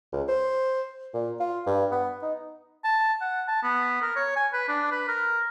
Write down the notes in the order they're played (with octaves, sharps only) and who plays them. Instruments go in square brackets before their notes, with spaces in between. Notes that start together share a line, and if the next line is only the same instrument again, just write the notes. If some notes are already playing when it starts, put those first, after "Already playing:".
[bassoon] C#2
C5
A#2
F4
G2
B3
D#4
[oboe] A5
F#5
A5
B3
A#4
C#5
G#5
B4
D4
B4
A#4